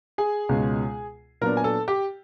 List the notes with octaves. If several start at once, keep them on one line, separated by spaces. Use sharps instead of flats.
G#4 G#5
C#2 B2 G#3 C#4
A#2 F#3 B3 D4 A#4 A#5
G#5
A4 A5
G4 G5